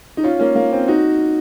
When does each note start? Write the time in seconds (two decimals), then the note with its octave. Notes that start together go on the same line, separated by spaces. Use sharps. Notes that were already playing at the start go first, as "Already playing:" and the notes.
0.17 D#4
0.24 C#4 F4
0.39 A#3 C#4
0.55 A#3
0.72 C4
0.88 D#4 F#4